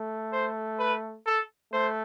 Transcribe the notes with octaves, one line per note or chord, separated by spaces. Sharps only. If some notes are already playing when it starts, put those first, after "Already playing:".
Already playing: A3
C5
B4
A4
A3 C5